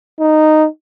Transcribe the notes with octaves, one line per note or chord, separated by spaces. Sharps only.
D#4